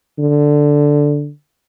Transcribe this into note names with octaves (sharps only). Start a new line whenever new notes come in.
D3